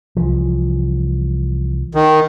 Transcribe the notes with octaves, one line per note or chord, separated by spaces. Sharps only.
C2 E3 F3
D#3